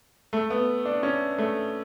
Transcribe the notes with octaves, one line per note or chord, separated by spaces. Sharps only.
A3
B3
D4
C#4
A3